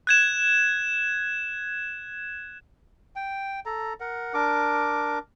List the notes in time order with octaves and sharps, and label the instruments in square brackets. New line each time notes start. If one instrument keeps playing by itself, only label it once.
[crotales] F#6 G#6 E7
[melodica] G5
A4 A#5
A#4 F#5
D4 A#4 D6